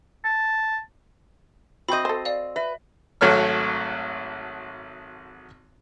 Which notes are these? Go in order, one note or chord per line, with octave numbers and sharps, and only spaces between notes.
A5
C4 F#4 D#5 G5 B5 C#6 G6
A4 C5
D5 F5
B4 E5
G#1 F#3 A3 C#5 F6